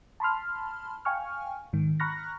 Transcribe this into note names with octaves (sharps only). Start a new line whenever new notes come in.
A5 B5 C6 F6
F5 G5 G#5 C#6 F6
G#2 D#3
A#5 B5 C#6 F6 F#6 A#6